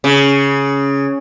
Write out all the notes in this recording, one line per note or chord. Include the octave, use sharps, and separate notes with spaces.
C#3